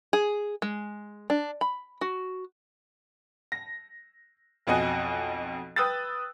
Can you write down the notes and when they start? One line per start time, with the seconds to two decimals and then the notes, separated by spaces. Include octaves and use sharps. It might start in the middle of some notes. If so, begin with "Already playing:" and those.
0.13 G#4
0.62 G#3
1.30 D4
1.61 B5
2.01 F#4
3.52 A#6
4.67 B1 F2 F#4 D#5 G#5 F#6
5.76 B4 G5 D#6 E6 F#6 A6